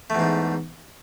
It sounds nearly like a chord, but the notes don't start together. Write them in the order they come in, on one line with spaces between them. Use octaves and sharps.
A3 E2 G#2